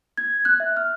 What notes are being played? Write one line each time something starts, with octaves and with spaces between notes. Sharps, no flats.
G#6
F#6
E5
F6